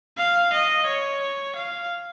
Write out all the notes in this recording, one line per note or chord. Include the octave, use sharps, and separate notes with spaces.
F5
D#5
C#5
F5